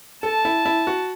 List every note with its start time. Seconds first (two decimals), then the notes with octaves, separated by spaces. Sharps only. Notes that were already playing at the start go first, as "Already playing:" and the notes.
0.23 A4 A5
0.45 E4
0.65 E4
0.87 F#4